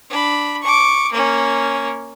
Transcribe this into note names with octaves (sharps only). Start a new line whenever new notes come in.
D4 B5
C#6 D6
A#3 C#4